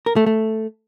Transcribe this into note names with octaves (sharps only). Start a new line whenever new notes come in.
A#4
A3
A3